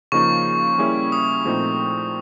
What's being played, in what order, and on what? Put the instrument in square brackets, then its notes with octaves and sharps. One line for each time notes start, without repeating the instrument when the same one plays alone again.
[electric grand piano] C#3 F3 A#3 D#4 [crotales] C#6
[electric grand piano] G3 A#3 C#4 E4 G#4
[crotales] D#6
[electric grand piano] A#2 F3 A3 C4 D#4